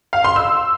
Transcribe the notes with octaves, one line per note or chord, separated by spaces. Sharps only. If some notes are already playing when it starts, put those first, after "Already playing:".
F5
C6
E6